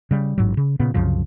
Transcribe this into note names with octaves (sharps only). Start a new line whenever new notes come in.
C#3 G3
A1 G#2 F#3
C#3
A#2 C#3 B3
C2 F#2 C#3 F3